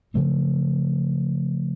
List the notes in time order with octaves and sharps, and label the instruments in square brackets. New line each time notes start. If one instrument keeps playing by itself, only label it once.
[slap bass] C#3 F3 A3 C4